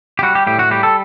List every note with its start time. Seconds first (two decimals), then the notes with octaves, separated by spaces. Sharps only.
0.19 G4
0.23 G3 F#4
0.35 G4
0.47 A2 G4
0.59 F#4
0.71 G3 G4
0.83 A4